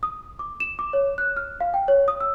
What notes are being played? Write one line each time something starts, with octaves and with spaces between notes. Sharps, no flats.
D#6
D6
E7
D6
C#5
F#6
F6
F5
G5
C#5
D#6
E6